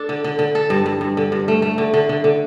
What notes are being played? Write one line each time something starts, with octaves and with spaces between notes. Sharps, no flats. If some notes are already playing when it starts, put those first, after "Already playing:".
Already playing: D4 A4
D3
D3
D3
A4
G2
G2
G2
D3
G2
A3
A3
D3
D3
D3
D3